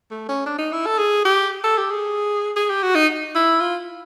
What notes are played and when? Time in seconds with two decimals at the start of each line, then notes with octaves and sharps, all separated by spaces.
0.11 A3
0.28 C#4
0.46 D4
0.58 D#4
0.72 E4
0.86 A4
0.98 G#4
1.25 G4
1.64 A4
1.78 G4
1.90 G#4
2.56 G#4
2.69 G4
2.82 F#4
2.95 D#4
3.35 E4
3.60 F4